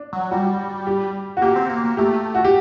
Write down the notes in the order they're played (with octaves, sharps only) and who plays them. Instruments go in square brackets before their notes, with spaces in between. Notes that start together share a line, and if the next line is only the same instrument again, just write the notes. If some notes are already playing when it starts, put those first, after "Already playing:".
Already playing: [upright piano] D4
[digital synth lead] F#3
[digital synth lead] G3 [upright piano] F#4
[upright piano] G4
F#4
[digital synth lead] A#3 [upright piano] G4
[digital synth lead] C4
A#3
A#3
[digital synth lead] A3 [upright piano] G4
[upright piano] F#4
G4